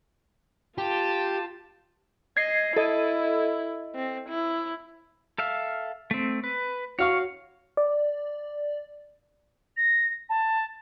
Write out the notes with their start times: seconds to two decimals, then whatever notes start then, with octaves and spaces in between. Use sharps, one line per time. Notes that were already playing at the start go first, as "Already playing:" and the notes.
0.78 F4 G4 A5
2.37 D#5 G#6 C7
2.76 E4 A4 D#5
3.95 C4
4.29 E4
5.38 A4 E5 F5
6.11 A3 C4
6.44 B4
6.99 F#4 C#5 F5 C#6
7.77 D5
9.77 A#6
10.29 A5